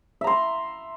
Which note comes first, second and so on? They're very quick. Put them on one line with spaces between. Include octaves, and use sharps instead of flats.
E5 A#5 C6